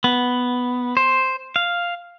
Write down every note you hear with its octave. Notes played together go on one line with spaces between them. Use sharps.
B3
C5
F5